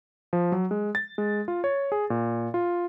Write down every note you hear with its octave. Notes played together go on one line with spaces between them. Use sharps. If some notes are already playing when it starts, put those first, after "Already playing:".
F3
F#3
G#3
A6
G#3
F4
C#5
G#4
A#2
F4